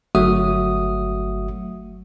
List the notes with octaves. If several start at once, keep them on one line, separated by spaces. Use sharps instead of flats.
G1 F#3 A3 F#4 E5 D#6